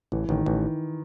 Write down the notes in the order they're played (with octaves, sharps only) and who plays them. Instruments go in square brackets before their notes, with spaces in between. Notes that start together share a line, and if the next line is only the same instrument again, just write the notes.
[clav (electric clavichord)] A1 [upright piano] E3
[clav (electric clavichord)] A1 [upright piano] D#3
[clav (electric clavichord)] A1 [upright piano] E3